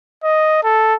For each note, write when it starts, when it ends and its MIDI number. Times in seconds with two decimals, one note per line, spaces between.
0.24 0.61 75
0.64 0.95 69